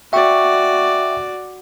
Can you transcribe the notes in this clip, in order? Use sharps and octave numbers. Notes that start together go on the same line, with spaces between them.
F#4 D5 E5 G5 C#6